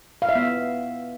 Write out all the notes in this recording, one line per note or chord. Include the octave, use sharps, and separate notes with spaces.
F5
E5
B3